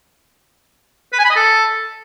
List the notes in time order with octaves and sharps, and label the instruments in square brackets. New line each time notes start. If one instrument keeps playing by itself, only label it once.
[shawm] B4
G#5
B5
D#5
A4